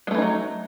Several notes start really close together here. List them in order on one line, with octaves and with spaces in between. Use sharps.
G#3 A3 E3 D#4 F#3